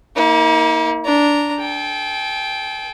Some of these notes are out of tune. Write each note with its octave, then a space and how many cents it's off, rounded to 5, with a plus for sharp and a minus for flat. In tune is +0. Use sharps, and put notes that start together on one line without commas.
A#3 +0 D#4 +45
D4 -10 A#5 -5
A4 -40 G5 +0